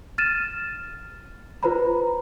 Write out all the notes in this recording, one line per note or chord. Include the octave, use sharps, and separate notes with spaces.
F6 A6 D#7 E7
F4 B4 C5 A#5 B5